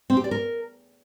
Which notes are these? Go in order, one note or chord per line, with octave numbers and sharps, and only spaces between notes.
C4
G4
D5
A#4